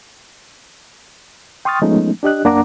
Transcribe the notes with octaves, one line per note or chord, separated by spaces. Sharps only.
G5 C6 C#6 D#6 F6 A6
F3 G#3 A3 B3 C#4 D#4
D4 G4 D#5 F#6
F#2 A#3 D4 F#5 A#5 D6